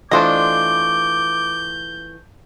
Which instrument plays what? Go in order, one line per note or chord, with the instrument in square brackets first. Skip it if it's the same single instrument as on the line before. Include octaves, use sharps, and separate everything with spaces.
[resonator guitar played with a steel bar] E3 A3 F4 [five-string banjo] D4 C5 D#5 [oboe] D6 [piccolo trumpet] G6